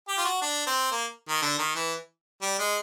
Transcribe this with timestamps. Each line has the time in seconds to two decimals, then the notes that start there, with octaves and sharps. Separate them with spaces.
0.08 G4
0.17 F4
0.25 F#4
0.41 D4
0.66 C4
0.91 A#3
1.29 D#3
1.42 D3
1.58 D#3
1.75 E3
2.42 G3
2.59 G#3